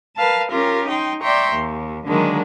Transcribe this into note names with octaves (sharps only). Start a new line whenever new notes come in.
A#4 B4 F5 A5
C#4 F4 G4 A#4
D#4 G5 C6
D5 E5 G5 A#5 C6 C#6
D#2
D3 D#3 F#3 G#3 A#3 D4